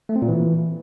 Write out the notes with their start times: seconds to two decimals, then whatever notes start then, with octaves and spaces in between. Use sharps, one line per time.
0.09 A3
0.16 C4
0.22 A#2
0.28 E3